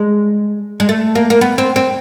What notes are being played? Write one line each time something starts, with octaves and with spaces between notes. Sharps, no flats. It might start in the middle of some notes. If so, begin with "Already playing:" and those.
Already playing: G#3
G#3
A3
A#3
A#3
B3
C4
C4